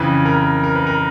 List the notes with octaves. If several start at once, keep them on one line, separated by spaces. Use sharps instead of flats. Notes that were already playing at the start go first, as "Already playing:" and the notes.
Already playing: F2 C#3 E3 B4
A#4
A#4
B4
A#4